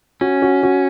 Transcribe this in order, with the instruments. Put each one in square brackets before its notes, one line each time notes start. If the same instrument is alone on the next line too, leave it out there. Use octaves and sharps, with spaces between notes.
[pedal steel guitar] C#4 [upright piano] F#4
[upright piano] F#4
F#4